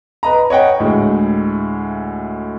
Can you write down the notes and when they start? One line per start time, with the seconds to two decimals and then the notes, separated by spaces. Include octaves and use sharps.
0.23 B4 D#5 A#5
0.50 C#5 D#5 F#5 G5
0.80 D2 A2 G#3